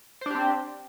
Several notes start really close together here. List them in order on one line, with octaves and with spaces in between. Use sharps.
C5 D4 G4 C4